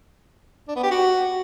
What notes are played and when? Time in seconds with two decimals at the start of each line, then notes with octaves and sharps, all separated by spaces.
0.68 D4
0.76 B3
0.83 G4
0.91 F#4